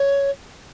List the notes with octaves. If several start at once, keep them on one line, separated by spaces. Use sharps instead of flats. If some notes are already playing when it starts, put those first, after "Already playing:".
Already playing: C#5